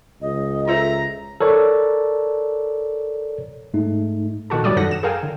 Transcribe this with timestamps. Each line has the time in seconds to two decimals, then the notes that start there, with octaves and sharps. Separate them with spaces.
0.22 C#2 D#5
0.68 F4 A4 C5 E5 A#5
1.40 A4 A#4 C#5 D5
3.74 G#2 A3 D#4
4.50 A#2 D#3 F#4 A4
4.64 F#2 D3 F#3 G3 D5 D#6
4.76 F#2 D#3 A4 F#5 A#6
4.91 E7
5.03 G#4 A#4 F5 G5 G#5
5.23 D3